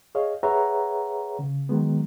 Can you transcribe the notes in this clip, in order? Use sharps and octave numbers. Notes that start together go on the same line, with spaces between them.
G#4 C#5 D#5 F5
G#4 B4 C#5 E5 F#5 A#5
C#3
D#3 F#3 G#3 B3